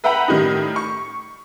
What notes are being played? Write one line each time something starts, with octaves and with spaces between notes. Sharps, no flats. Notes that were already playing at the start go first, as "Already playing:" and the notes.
B4 E5 F#5 G5 A#5 B5
A2 D#3 G3 D#4
C#6